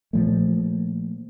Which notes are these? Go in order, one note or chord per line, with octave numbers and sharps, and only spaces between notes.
A#2 F3 A3